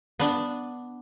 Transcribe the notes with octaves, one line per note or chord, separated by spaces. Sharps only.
B3 D4